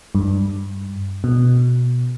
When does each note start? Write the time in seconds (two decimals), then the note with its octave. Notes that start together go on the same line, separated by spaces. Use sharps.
0.15 G2
1.24 B2